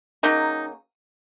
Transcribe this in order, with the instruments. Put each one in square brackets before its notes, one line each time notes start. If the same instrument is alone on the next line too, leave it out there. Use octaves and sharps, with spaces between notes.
[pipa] C#3 F#3 A#3 D#4